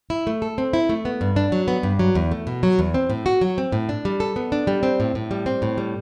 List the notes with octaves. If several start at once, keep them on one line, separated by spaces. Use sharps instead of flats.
E4
A3
A4
C4
E4
A3
B3
G2
D4
F#3
B3
G2
F#3
E2
A3
B2
F#3
E2
C4
A2
F#4
F#3
C4
A2
D4
G3
A4
B3
D4
G3
C4
A2
A2
G3
C4
A2
G3